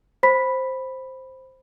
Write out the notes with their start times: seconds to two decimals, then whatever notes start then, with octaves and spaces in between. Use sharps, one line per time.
0.23 C5 B5 B6